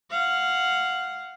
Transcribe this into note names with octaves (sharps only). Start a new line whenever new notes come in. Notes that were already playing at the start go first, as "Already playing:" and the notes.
F5 F#5